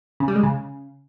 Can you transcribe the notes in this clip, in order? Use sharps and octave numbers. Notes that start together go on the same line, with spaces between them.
C#3
G3
G#3
C#3